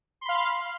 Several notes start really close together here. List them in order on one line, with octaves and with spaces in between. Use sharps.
C6 B5 F5